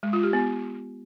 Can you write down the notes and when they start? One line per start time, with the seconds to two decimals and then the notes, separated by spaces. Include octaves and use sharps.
0.03 G#3
0.13 F4
0.23 G4
0.33 B3